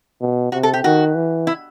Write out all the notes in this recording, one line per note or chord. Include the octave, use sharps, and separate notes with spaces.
B2
C3 F#4
A4
G4
D#3 F#4
E3
E4